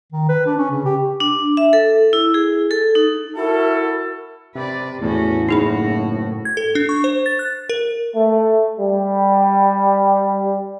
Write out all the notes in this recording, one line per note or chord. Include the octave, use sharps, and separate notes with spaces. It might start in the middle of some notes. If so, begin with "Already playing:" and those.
D#3
B4
D4
C#4
C#3
G4
D4
E5
A4
E4
G#4
A4
D#4
E4 F#4 A4 A#4
C3 B4 D5
E2 A2 C#4 F#4
F#1 D#4 F#4 G#4 B5
G#6
A4
D4
C#6
C5
A6
F#6
A#4
A3
G3